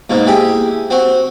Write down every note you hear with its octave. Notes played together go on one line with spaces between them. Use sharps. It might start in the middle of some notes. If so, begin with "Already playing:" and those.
G#2 B2 A#3
E4 G4 G#4
C4 F#4